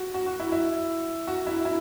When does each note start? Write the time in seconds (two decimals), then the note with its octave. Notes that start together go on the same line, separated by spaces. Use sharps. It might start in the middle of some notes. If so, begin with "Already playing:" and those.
Already playing: F#4
0.14 F#4
0.26 F#4
0.40 E4
0.52 E4
1.27 F#4
1.47 E4
1.65 E4